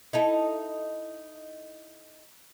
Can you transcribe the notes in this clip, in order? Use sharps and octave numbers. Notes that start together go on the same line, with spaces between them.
D#4 E4 A4